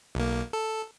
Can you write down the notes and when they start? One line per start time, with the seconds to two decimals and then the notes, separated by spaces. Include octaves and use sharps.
0.15 B1 A#3
0.53 A4